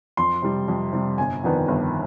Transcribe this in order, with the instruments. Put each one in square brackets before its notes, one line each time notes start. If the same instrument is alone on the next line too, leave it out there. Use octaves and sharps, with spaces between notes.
[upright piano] F2 C6
C3 G3
F2
C3 G3
G1 G#5
F2 D#3 B3 D4
G1